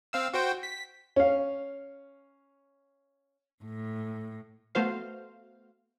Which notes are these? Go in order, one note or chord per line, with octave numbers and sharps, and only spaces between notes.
C4 F5 E6
F#4 C5 G5
B6
C#4 F5
A2
A3 B3 F#4 C5 F5